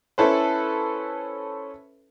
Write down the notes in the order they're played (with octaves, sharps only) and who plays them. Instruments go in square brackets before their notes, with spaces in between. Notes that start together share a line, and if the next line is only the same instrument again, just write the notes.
[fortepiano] C#4 E4 A4 B4 C5